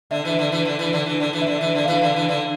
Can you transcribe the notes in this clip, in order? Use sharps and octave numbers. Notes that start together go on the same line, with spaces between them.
D3 E5
E3
D3
E3
D3
E3
D3
E3
D3
E3
E5
D3
E3
D3
E3 F5
D3
E3
D3